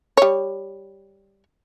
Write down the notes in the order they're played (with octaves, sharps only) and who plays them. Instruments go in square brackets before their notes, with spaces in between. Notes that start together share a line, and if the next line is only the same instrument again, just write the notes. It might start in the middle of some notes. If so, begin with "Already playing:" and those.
[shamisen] G3 C#5